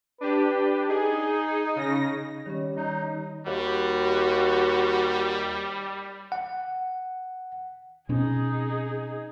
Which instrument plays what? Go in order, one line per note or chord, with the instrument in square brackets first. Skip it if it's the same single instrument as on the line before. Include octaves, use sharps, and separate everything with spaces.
[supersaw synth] D4 G4 [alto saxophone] B4
[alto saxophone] D#4 [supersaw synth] G#4
[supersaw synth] C#3 A#6
[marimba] D#3 C#4 [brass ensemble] G3 C#5
[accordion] D#4
[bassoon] D#2 [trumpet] G3 [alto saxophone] F#4
[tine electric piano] F#5
[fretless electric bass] B2 C4 C#4 [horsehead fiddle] D#4 G#4